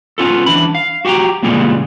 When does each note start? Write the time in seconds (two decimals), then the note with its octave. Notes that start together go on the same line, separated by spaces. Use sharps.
0.18 B3 C#4 F4 A4
0.46 E3 D4 B5
0.75 F5
1.05 F#4 G4 F#5 G5 A#5
1.43 A#2 C#3 E3 G3 G#3 B3